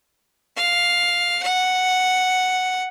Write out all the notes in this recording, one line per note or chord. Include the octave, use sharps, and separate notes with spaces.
F5
F#5